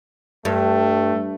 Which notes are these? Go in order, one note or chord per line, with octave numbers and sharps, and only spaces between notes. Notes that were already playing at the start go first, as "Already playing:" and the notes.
G2 A3